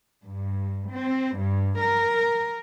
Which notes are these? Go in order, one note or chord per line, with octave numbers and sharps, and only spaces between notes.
G2
C4
G2
A#4